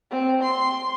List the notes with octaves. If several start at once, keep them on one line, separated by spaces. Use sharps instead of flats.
C4
C6